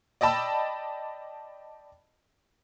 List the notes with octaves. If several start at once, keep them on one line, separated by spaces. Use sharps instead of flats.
D5 D#5 G5 A5 B5 E6